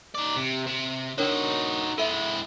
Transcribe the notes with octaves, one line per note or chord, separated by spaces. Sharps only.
D#4 D5
C3
C3
D4 D#4 F#4 A#4 C#5
G#3 E4 A4 E5